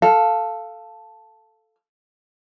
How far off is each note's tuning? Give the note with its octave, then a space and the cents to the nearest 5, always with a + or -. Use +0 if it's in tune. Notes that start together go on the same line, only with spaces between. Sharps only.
A4 +0 F5 +0